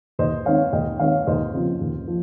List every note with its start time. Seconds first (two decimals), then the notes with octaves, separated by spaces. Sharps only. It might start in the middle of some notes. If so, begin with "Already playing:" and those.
0.19 D#2 C5 D#5
0.45 D#3 G#3 C4 D#4 C#5 F5
0.73 D#2 D#5 G5
0.99 D#3 G#3 C4 D#4 C#5 F5
1.27 D#2 C5 D#5
1.54 C#3 F3 C4 F4
1.81 D#2
2.08 F3